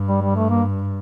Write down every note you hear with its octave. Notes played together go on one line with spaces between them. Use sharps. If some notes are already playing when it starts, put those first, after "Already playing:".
Already playing: G2
G3
G3
A3
A#3